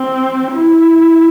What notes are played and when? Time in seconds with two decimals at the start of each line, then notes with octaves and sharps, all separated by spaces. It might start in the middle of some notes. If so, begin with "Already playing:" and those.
Already playing: C4
0.52 E4